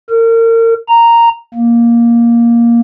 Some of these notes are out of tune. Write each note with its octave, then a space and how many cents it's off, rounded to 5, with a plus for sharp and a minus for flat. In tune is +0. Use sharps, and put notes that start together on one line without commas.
A#4 -35
A#5 -5
A#3 +10